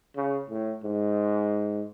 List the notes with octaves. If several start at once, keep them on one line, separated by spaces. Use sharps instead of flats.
C#3
A2
G#2